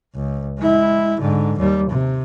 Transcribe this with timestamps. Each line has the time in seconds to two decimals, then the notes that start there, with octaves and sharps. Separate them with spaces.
0.15 C#2
0.58 G#3 E4
1.20 G#2 D3
1.59 D#2 G3
1.90 C3